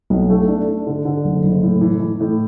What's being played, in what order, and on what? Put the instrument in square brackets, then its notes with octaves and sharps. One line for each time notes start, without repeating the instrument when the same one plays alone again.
[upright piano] B1
A3
D4
D4
D3
D3
F#1
F#1
A2
E3
E3
A2